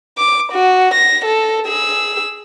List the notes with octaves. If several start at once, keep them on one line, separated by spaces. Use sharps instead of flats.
D6
F#4
A#6
A4
G#4 E6